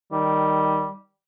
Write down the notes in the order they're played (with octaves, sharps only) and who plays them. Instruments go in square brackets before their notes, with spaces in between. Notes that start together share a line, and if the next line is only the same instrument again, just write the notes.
[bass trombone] D#3 [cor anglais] G3